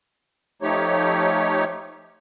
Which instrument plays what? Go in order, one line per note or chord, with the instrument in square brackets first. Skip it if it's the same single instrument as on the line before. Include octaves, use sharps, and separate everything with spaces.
[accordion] F3 A3 D#4 G4 C#5